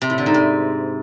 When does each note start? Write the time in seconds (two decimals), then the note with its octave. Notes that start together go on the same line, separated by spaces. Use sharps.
0.02 C3
0.10 A2
0.18 D3
0.26 G#2
0.34 C3